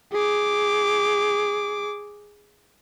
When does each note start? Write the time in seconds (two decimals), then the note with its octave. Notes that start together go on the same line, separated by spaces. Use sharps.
0.12 G#4 D6